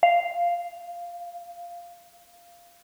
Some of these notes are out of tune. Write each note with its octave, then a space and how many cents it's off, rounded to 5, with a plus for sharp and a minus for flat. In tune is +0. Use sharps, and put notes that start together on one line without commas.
F5 -5